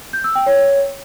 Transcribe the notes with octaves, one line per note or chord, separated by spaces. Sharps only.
G6
E6
G5
C#5